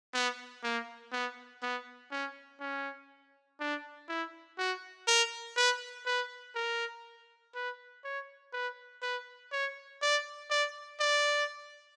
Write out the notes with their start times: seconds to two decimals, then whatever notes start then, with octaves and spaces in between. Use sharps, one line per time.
0.14 B3
0.64 A#3
1.12 B3
1.62 B3
2.11 C#4
2.60 C#4
3.60 D4
4.09 E4
4.59 F#4
5.08 A#4
5.57 B4
6.06 B4
6.56 A#4
7.55 B4
8.05 C#5
8.53 B4
9.02 B4
9.52 C#5
10.02 D5
10.51 D5
11.01 D5